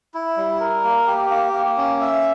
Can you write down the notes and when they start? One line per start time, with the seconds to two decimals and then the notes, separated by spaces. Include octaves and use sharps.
0.14 E4
0.36 G3
0.60 A#4
0.84 A#3
1.07 G4
1.30 A#3
1.53 A#3
1.77 C#4
2.01 E5